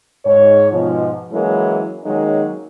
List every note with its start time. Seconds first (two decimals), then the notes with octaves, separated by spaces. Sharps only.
0.25 G#2 C#5
0.72 G#2 B2 F3
1.32 E3 F#3 G#3 A#3 C#4 E4
2.04 D#3 F#3 G#3 A#3 C#4 D#4